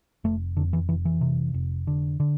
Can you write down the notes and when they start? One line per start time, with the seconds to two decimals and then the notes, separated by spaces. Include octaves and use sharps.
0.24 F1 A3
0.57 F2 D3
0.73 E3
0.89 F1 E3
1.05 E3
1.21 C3
1.54 F1
1.87 D3
2.20 D3